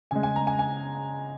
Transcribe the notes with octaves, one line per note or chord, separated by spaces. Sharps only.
C#3 G#3 G#5
G#5
A#5
G#5
G#5